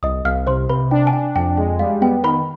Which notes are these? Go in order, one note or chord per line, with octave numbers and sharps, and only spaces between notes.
C2 D#5 D#6
C2 F5 F6
C3 C5 C6
C3 B4 B5
D4 G5
G#5
D4 G5
F2 G5
G#3 G5
G3 F5
B3 G5
D#3 B4 B5